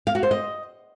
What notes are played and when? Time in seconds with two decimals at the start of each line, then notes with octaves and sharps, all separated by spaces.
0.07 F5
0.15 F#4
0.23 C5
0.31 D#5